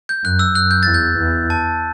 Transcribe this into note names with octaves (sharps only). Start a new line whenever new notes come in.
G6
F#2 F#6
E6
F#2 F#6
G6
E2 A6
G6
E2
A5